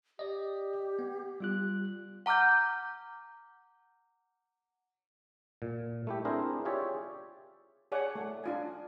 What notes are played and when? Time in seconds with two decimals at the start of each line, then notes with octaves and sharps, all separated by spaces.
0.19 G4 D5 D#5
0.99 B3
1.40 G3 F4 F#6
2.26 F#5 A#5 D6 F6 G6
5.62 A#2
6.07 A3 E4 G4
6.25 C4 D4 E4 G#4 A#4 C5
6.65 F4 G4 G#4 C#5 D5 E5
7.92 G#4 C#5 D5 F#5
8.15 A3
8.44 D4 F4 G#5